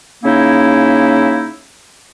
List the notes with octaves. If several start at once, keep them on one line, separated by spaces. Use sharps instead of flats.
C#3 A#3 C#4 D#4 E4